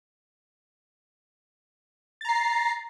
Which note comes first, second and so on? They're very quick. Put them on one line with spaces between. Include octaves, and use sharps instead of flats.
A6 A#5 C7